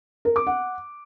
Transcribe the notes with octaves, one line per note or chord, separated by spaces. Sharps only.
A#4
D6
F#5